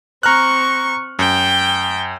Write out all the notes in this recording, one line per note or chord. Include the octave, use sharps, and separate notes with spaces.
C4 A#5 C#6 F6 F#6
F#2 G5